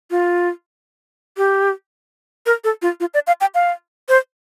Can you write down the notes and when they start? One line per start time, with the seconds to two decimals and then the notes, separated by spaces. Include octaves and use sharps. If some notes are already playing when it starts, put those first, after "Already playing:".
0.11 F4
1.37 G4
2.46 A#4
2.64 A4
2.82 F4
3.00 F4
3.14 D5
3.27 F5
3.41 G5
3.55 F5
4.09 C5